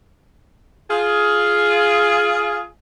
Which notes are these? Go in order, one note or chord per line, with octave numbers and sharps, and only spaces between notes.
F4 G#4